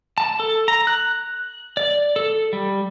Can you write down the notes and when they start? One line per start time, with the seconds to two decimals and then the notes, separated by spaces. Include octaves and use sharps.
0.18 A5
0.40 A4
0.68 A#5
0.87 F#6
1.77 D5
2.16 A4
2.53 G3